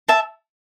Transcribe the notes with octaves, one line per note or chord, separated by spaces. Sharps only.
E5 A5